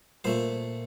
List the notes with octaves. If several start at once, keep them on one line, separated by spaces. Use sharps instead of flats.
A#2 A3 C5